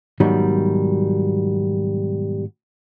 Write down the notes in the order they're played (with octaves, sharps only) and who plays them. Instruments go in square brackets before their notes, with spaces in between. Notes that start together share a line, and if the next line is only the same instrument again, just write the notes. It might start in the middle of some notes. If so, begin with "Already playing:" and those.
[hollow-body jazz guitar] G#2 B2 D#3 F#3 G3